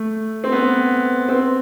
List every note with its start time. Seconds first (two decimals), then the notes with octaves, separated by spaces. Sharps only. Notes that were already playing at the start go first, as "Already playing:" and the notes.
Already playing: A3
0.44 C4
0.52 B3
1.29 C4